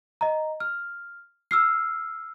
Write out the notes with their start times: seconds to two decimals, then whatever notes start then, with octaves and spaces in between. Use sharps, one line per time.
0.21 D#5 A#5
0.60 F6
1.51 E6 F6 C7